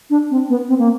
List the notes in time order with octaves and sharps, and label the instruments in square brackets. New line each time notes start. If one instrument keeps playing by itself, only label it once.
[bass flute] D4
C4
B3
C4
A#3